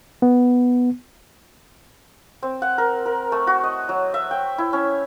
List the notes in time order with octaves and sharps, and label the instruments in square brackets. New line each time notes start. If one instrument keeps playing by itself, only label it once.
[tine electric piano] B3
[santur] C4
F#5
A#4
A#4
A3
F#4
D#5
F#3
E5
G5
E4
C#4